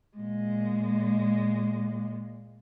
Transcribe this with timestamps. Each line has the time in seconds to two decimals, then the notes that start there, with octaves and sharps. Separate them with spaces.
0.17 A#2 G#3